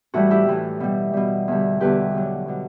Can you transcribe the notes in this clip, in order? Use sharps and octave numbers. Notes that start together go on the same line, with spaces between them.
A2 E3 G3 F#4
E4 G4
A2 E3 G3
B2 G3
B2 G3
E2 D3 G3
E2 D3 G3 G4 B4
B2 F#3
B2 F#3